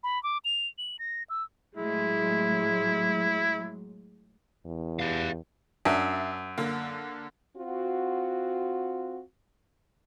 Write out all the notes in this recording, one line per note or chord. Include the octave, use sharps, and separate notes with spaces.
B5
D6
F7
F#7
A#6
E6
A2 F#3 G#3 E4
E2
G4 F5
F#2 D4 E5
D3 A#3
C4 F4 F#4